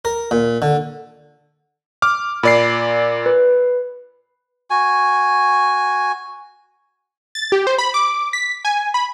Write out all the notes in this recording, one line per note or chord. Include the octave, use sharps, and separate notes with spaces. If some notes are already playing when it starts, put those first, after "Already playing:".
A#4
A#2
D3
D6 F6
A#2 D5 B5 C7
B4
F#4 G#5
A6
G4
C5
B5
D6
B6
G#5
B5